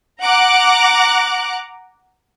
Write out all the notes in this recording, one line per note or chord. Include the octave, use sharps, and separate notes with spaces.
F#5 A#5 D6 F#6